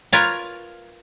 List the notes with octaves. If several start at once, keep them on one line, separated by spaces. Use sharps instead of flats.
F4 A#4 B4 C#5 F5